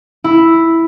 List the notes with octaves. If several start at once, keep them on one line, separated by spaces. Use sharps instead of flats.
E4